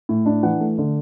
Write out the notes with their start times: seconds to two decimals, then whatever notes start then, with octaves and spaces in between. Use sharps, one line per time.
0.09 A2
0.26 D4
0.43 E3 F#5
0.61 A3
0.78 D3